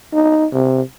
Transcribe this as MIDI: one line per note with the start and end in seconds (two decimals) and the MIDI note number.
0.13 0.46 63
0.53 0.81 48